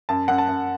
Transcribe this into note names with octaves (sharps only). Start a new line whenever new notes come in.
F#2 A5
F#2 F#5
A5
F#2